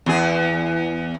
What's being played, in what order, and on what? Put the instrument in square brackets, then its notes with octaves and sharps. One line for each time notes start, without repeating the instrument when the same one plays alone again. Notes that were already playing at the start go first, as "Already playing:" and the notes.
[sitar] E2 G#4